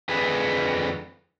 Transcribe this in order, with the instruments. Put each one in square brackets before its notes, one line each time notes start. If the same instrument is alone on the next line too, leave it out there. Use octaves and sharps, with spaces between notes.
[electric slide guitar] F2 D3 G#4 B4